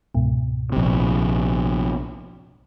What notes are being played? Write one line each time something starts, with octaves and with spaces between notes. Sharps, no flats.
C#2 G#2 B2
A#1 C3